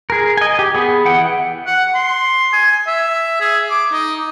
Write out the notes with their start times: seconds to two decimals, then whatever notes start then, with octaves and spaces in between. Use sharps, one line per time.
0.10 G#4 A#4
0.37 D#5 G#5
0.59 G4
0.75 B3 G#4
1.05 E3 F#5 G5
1.66 F#5
1.95 C6
2.53 G#5
2.87 E5
3.41 G#4
3.70 D6
3.92 D#4